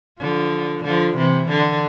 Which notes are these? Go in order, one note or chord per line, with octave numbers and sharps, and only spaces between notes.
D3 F3
D3 F3
C3 E3
D3